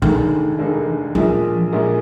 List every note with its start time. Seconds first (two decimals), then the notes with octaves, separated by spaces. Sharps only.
0.02 F1 D#2 D3 D#3 G#3 D#4
0.58 F1 D#2 D3 G#3 D#4
1.15 A#1 A#2 F3 G#3
1.73 A#1 A#2 G#3